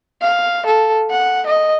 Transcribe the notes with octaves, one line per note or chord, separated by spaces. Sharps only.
F5
A4
F#5
D#5